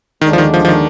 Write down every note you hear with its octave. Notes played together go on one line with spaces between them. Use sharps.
D#2 D3 D#3 G#3 D4
F3
D#3
F3
F3
D#3